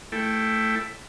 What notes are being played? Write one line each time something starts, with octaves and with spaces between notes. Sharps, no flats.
A3 E4 A4 G5